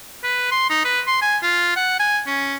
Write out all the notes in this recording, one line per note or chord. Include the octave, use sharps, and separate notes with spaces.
B4
C6
D#4
B4
C6
G#5
F4
F#5
G#5
C#4